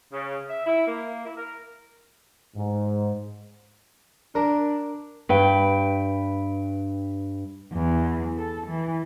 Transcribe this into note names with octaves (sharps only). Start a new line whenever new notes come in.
C#3
E5
E4
A#3
E4
A#4
G#2
D4 A#4
G2 B4 G5
E2
A4
E3